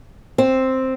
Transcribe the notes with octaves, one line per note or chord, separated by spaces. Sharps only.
C4